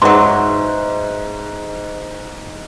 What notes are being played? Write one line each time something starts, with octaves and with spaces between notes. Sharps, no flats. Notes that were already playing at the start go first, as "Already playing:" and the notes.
G#2 E3 F#3 C6